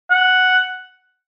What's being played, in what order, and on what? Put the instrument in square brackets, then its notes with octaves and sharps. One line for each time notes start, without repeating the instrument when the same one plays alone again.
[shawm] F#5